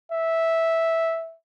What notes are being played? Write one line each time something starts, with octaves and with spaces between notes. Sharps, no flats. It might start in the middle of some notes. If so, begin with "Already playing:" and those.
E5